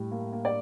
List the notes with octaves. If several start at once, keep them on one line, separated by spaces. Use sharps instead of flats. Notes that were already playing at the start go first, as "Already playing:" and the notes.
Already playing: A2 G3
A#3
A#3
D5